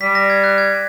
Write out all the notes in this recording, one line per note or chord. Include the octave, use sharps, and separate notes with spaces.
G3 B6
A#6
G#6
F#6
G#6